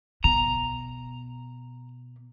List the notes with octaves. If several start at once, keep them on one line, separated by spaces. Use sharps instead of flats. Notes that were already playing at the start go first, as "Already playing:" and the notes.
B2 A#5